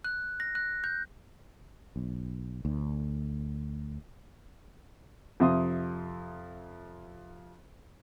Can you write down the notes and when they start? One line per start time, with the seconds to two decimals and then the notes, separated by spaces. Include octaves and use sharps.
0.04 F#6
0.40 A#6
0.55 F#6
0.84 G6
1.96 B1
2.65 D2
5.40 F2 C3 E5 F5 C6 D#6